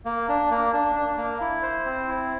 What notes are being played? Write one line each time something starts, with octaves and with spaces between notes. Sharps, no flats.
A#3
D4
A#3
D4
D4
A#3
E4
C5
C4
E4